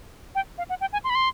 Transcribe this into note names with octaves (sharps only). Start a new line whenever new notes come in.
G5
F5
F#5
G5
G#5
C6
B5
C6